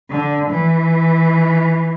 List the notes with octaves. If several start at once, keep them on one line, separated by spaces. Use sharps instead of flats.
D3
E3